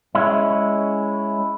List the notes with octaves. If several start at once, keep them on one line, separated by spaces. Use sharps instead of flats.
G#3 C#4 E4